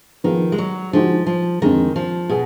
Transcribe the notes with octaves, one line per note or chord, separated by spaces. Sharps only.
D#3 F3 B3 F4 G#4
G#3
F#3
D3 F3 G#3 D#4 F#4
F3
F2 D3 D#3 G#3
F3
B2 G#4